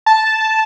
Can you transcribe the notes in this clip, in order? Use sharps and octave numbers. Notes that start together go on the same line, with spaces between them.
A5